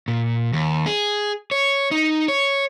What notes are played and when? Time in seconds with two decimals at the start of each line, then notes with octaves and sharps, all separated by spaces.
0.08 A#2
0.53 D#2
0.86 G#4
1.51 C#5
1.91 D#4
2.28 C#5